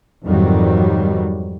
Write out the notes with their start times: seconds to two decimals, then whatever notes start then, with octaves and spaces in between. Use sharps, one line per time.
0.24 F2 G#2 D#3 F#3 G3